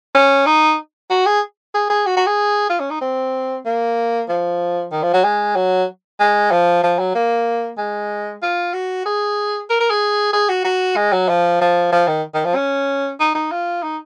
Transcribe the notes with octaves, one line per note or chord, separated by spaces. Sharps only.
C#4
D#4
F#4
G#4
G#4
G#4
F#4
F#4
G#4
F4
C#4
D#4
C4
A#3
F3
D#3
F3
F#3
G#3
F#3
G#3
F3
F3
F#3
A#3
G#3
F4
F#4
G#4
A#4
A#4
G#4
G#4
F#4
F#4
G#3
F#3
F3
F3
F3
D#3
D#3
F3
C#4
D#4
D#4
F4
D#4